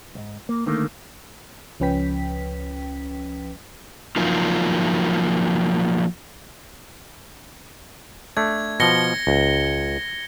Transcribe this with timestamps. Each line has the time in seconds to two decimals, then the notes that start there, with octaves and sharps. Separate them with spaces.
0.15 B1 G#2
0.49 A#3
0.66 D2 D3 D#3 A3 A#3
1.80 C#2 F3 C#4 B4 G5 B6
4.16 F3 F#3 A#3 D#4 F4
8.37 A3 D4 G#6
8.80 B2 F3 A#6 C#7 G7
9.27 C#2